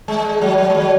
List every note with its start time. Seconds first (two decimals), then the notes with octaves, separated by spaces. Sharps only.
0.08 G#3
0.41 F#3
0.58 F#3
0.70 G#3
0.75 F#3